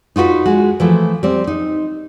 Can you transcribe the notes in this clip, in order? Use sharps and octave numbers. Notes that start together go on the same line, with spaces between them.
D#4 F4 F#4 A#4 B4
G#3 F#4
E3 F3 A3
G3 C4
D#4